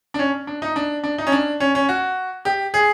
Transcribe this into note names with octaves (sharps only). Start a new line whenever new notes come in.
D4
C#4
D4
D#4
D4
D4
D#4
C#4
D4
C#4
C#4
F#4
G4
G#4